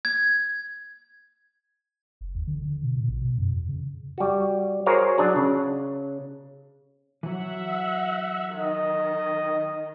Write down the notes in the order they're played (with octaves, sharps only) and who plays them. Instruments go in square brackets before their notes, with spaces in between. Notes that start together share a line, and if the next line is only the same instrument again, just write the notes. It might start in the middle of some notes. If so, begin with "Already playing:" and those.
[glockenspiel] G#6
[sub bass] F1
D#2
D3
D3
B2
A#2
A#1
B2
F#2
F2
C#3
[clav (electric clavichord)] G3 F#4
F#4 G#4 A#4 C5 C#5
F#3 D4 G#4
C#3
[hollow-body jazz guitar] E3 F#3 [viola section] E5 F#5
[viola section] D#3 [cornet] D#5